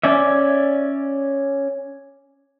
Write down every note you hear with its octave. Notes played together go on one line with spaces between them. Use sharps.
C#4 D5 E5